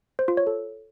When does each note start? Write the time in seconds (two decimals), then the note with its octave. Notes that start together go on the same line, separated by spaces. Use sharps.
0.19 C5
0.28 F4
0.37 C#5
0.47 A4